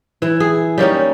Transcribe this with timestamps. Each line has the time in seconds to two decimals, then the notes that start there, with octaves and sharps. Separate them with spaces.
0.22 E3 E4
0.40 G#4
0.78 G3 A#3 C#4 D#4